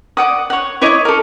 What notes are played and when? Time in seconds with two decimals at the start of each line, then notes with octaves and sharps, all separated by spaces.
0.17 D5 F#5 D#6
0.50 C#5 F#5
0.81 E4 C#5 D#5 D6
1.05 A4 A#4